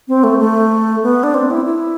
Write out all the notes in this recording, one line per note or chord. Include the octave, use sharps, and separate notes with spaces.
C4
A3
A3
B3
D4
C4
E4
E4